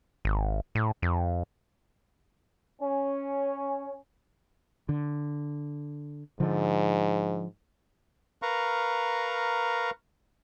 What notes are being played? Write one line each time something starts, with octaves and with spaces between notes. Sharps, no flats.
G#1
A2
F2
C#4
D3
G#2 D3 F3
A#4 B4 F5 A#5 C#6